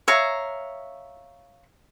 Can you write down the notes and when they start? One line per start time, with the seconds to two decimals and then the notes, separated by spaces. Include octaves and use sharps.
0.08 C#5 E5 F5 A#5